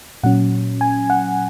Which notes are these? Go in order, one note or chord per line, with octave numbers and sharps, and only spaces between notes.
A#2 F#3 C#4 F#5
G#5
F#5